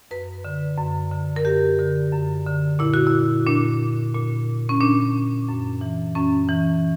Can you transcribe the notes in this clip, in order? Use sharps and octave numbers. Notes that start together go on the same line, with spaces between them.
F#2 B4
D3
F#2
D3
A#4
F#2 G4
D3
F#2
D3
A#2 E4
F#4
E4
A#2 D4
A#2
C#4
A#2 D4
F#2
E3
F#2 C#4
E3